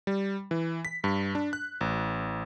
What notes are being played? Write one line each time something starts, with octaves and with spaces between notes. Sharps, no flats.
G3
E3
B6
G2
D4
F#6
A1